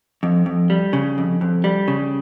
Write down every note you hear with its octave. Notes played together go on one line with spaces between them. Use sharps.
F2
F2
G3
C#3
F2
F2
G3
C#3